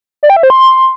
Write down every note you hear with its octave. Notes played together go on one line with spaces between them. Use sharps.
D5
G5
E5
C5
C6